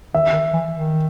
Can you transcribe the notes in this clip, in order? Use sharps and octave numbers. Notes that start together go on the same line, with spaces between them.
D#3 E5
D#3
E3
D#3